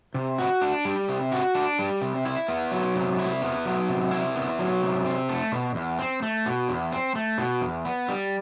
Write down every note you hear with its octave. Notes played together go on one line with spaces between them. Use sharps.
C3
F#4
D4
G3
C3
F#4
D4
G3
C3
E4
B3
F#3
C3
E4
B3
F#3
C3
E4
B3
F#3
C3
C4
A3
B2
E2
C4
A3
B2
E2
C4
A3
B2
E2
B3
G3